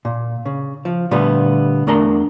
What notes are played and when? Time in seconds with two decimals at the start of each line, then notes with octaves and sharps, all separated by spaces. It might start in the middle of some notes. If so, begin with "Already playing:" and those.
0.05 A#2
0.45 C#3
0.85 F3
1.11 A#2 D3 G3 A3 B3
1.87 E2 A3 D4 A#4 A#5 C6